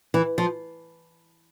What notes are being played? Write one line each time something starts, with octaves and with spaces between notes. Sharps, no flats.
E3
F3